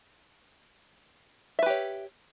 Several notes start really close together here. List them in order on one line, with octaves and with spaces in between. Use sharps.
E5 B4 G4 C#5